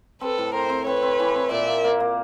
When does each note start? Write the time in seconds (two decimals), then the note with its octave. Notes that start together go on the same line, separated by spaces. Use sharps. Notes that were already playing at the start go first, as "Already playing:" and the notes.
0.21 C4 A4 B4
0.38 A2
0.54 C4 A#4 C5
0.70 C4
0.86 C4 B4 C#5
1.03 C4
1.20 E3
1.35 C4
1.51 A#2 D5 E5
1.67 A#3
1.84 A#3
2.00 A#3